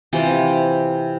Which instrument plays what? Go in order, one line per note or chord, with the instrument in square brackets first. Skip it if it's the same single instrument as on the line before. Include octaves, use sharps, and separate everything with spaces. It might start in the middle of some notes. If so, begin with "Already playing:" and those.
[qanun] C3 E3 F4 G5